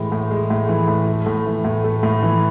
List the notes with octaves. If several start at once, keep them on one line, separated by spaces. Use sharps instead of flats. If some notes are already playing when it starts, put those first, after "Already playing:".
Already playing: A2 E3 G#3
A2
G#3
A2
E3
A2
A3
A2
E3
A2
A3
A2
E3